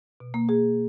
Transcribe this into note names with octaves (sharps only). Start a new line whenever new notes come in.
B2
A#3
G#4